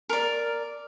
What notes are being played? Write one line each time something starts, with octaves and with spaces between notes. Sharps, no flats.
A#4 D5